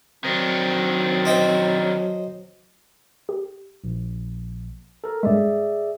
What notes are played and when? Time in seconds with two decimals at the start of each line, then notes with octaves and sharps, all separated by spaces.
0.24 D#3 F#3 C4 D4
1.25 C5 D#5 G5
3.29 G4
3.84 A#1
5.04 A4 A#4
5.23 G2 G#3 G#4 D5 E5